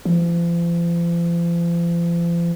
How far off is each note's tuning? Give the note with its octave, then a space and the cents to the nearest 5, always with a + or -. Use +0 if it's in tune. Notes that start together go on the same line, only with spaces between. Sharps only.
F3 -40